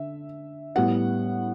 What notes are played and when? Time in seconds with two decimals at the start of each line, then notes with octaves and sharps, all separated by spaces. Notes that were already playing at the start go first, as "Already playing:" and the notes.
Already playing: D3 E5
0.75 A2 G3 B3 F#5